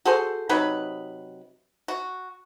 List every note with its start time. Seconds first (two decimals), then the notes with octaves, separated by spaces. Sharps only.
0.05 F#4 G#4 A4 C5
0.49 C3 F#3 D#4 B4
1.88 F#4